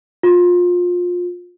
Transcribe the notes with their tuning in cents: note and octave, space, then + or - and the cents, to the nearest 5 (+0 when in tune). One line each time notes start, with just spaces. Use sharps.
F4 +25